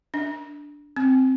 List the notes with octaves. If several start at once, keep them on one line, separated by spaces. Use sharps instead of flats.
D4
C4